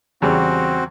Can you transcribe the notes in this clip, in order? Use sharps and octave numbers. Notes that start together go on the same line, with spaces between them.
E2 C#3 G3 C4 F#4